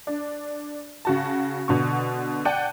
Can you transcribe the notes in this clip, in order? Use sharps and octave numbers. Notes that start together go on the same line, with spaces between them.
D4
C#3 F#4 A5
B2 D3 C#6
D5 F#5 G5 A5 D#7